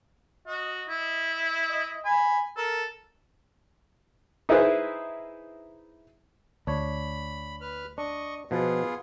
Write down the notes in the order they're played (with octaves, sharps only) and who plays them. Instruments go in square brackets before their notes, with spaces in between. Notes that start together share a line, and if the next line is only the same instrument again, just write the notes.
[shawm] F#4 [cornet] D#5
[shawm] E4
[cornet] D#5
[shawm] G#5 [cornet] B5
[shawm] A4 [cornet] A#4
[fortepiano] D#4 E4 G#4 B4 C5 E5
[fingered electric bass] D2 [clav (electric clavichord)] D4 C#5 [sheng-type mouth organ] B5
[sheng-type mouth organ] B4 F6
[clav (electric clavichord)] D4 [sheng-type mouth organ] D#5 C#6
[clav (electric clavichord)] B2 F3 [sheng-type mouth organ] B3 F4 G#4